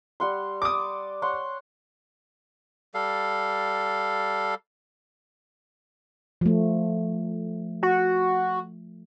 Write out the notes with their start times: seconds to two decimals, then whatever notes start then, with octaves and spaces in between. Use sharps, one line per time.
0.20 G3 F#5 C6
0.62 D5 D6 D#6
1.22 C#5 F#5 C6
2.94 G3 A4 F5
6.41 F3 A3
7.83 F#4